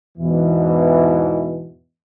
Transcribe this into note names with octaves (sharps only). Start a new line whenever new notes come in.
E2 G#2 B2 E3